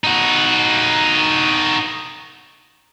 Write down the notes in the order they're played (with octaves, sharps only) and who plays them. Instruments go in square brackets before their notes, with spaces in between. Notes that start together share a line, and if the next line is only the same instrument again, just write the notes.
[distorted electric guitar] D#4 F#4